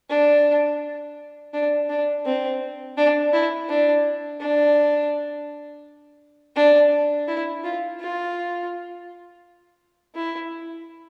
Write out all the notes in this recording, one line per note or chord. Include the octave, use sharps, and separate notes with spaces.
D4
D4
D4
C4
D4
E4
D4
D4
D4
E4
F4
F4
E4